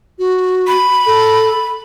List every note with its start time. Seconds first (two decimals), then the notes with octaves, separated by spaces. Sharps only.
0.19 F#4
0.67 B5
1.06 A4